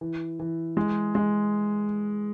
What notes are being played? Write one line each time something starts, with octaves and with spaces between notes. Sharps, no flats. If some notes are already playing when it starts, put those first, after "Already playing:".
E3
E3
G#3
G#3